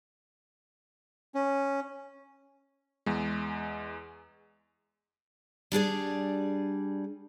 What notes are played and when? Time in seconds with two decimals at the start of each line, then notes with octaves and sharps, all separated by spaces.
1.34 C#4
3.06 E2 G#3
5.72 G3 D4 G#4 D5